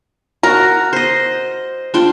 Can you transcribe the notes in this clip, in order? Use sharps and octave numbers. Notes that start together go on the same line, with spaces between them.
F#4 A#4
C5 D#5
D4 F4 G5